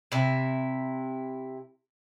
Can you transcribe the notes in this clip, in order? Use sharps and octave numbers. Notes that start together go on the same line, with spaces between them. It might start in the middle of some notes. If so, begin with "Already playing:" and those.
C3 E4